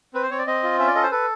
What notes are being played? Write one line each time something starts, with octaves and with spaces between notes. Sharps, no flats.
C4 B4
C5
C4 C#5
D5
C4 D#5
F4
C#4 E5
D5
A4 D#5
C5
A4 B4